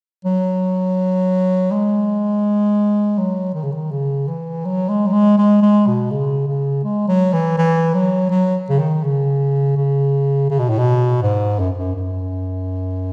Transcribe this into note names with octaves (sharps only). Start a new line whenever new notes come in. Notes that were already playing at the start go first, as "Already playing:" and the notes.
F#3
G#3
F#3
D#3
C#3
D#3
C#3
E3
F#3
G#3
F#3
G#3
G#3
G#3
B2
C#3
C#3
G#3
F#3
E3
E3
F#3
F#3
C#3
D#3
C#3
C#3
C#3
B2
A2
B2
G#2
F#2
F#2
F#2